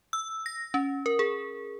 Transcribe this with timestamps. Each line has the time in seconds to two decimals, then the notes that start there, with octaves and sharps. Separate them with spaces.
0.13 E6
0.46 A#6
0.74 C#4
1.06 A#4
1.19 G#4